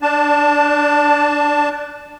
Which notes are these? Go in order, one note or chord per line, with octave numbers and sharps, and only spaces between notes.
D4 A5